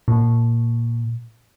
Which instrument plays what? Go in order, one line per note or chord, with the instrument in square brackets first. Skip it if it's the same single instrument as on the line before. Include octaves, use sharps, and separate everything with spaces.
[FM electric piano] A#2